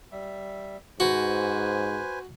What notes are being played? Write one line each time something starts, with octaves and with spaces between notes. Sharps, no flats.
G3 E5
G#2 F#4 B4 C5 G#5